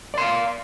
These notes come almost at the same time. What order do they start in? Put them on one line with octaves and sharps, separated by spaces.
D5 C6 F5